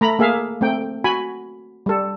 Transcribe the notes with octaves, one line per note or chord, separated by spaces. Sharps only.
A3 A#5 B5
A#3 G#4 E5 F5
A3 C4 G5
F#4 G#5 B5
G3 A4